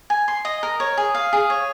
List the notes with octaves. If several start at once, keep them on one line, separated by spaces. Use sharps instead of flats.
G#5
C6
D#5
A#4
C#5
G#4
F5
G#4
C#5